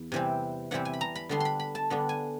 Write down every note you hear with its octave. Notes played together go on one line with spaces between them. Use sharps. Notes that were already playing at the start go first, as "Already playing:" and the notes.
Already playing: E2
C3 E3 G3 C4
C3 E3 G3 C4 F#5
G#5
B5
A#5
B5
D3 G3 B3 D4 C6
B5 C6
B5
A5
D3 G3 B3 D4
G#5